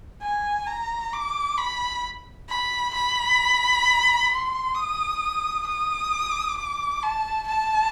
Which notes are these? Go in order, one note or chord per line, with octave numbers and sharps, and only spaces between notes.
G#5
A#5
D6
B5
B5
B5
C6
D#6
D#6
D6
A5
A5